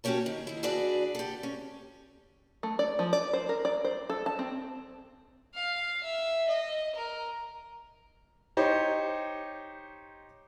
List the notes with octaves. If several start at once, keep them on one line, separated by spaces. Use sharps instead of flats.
A#3 C#4 F#4 G4 C#5 A5
D#3
D#3 E4
D4 F#4 G#4 B4 D5
G4 A4
C#4
A3
D5
F3
D5
C5
A#4
D5
C5
A4
A5
C4
F5
E5
D#5
A#4
D#4 G4 C5 C#5